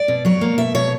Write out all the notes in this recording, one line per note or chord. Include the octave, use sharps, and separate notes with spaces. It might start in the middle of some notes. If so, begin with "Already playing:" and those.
Already playing: D5
B2
F#3 C#5
A#3
B2 E5
B2 C#5